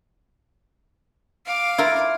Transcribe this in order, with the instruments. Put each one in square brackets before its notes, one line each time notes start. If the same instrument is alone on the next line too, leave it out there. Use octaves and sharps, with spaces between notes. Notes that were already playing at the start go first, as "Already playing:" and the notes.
[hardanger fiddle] F5 D6
[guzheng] E4 F4 A#4